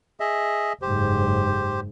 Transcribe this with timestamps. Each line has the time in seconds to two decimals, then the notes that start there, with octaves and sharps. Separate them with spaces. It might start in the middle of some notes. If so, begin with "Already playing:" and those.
0.20 G#4 D#5 E5
0.82 F#1 G#2 G4 C5